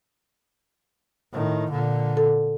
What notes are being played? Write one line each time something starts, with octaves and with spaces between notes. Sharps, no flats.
A2 D#3
A#2 D3
A4